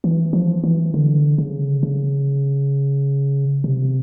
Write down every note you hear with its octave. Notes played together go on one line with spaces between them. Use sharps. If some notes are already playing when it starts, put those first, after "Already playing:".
E3
F3
E3
D3
C#3
C#3
C3